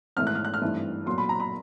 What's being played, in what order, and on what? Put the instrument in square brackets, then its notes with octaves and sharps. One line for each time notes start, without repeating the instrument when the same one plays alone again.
[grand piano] G#1 G#2 E3 A3 F6
F#6
F6
F#6
F6
G2 E3 A3 C4 D#4
B1 A#2 F#3 C6
B5
A#5
B5